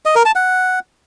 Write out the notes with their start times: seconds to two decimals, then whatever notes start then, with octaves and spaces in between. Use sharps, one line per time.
0.05 D#5
0.15 A#4
0.25 A5
0.35 F#5